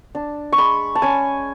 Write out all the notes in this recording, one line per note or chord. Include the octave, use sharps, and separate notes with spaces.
D4
C#6
G#3 B5
A5
C#4 G#5